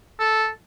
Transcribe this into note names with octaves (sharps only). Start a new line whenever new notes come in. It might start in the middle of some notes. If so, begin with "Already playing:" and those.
A4